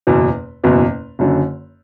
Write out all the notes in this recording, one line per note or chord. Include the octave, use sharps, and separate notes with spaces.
F#1 E2 B2
F#1 E2 B2
F#1 F#2 D3